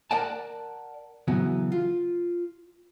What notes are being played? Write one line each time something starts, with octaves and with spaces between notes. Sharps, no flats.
A#4 D5 F#5 G5 A5
C#3 E3 F#3 B3
F4